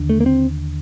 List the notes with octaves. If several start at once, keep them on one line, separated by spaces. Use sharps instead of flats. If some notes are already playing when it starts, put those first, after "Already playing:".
Already playing: D#2 D3
A3
A#3
C4